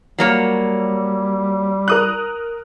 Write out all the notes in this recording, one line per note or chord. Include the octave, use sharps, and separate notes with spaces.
F#3 G3 A#3 C#5
A#4 D#6 F#6